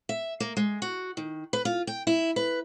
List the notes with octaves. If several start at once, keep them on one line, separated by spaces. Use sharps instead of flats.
E5
A#3
G#3
F#4
D#3
B4
F4
G5
E4
B4